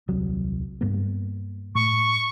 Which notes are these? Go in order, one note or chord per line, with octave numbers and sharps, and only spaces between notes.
D#1 C2 F#3
G2 A#3 B3
A2 C#6